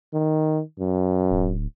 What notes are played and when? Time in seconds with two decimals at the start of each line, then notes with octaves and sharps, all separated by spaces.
0.14 D#3
0.79 F#2
1.31 D1